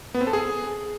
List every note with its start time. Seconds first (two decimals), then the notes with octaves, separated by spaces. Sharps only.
0.14 B3
0.21 C4
0.27 A4
0.33 G#4